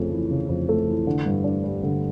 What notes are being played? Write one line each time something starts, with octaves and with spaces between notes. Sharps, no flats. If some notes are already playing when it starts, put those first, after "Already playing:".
Already playing: F2 C#3 A3
E3
C#3
F2
A3
E3
D3
G2
D4
G3
D3